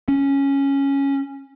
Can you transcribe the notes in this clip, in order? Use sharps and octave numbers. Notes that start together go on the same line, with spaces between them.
C#4